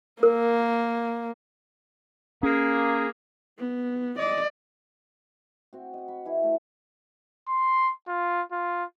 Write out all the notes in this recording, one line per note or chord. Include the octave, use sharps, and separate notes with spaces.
A#3 A#4
A#3 C#4 G#4
B3
D5 D#5
C4 F#4
D#5 F#5
B5 C#6
E3 E4 G#4
A3
C6
F4
F4